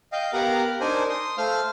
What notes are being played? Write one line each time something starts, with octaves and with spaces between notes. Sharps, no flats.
D#5 F5 G5
B3 G4 A#4 F5 F#5 A#5
D4 D#4 A#4 C5 G#5
C6 D#6
A3 C5 F5 F6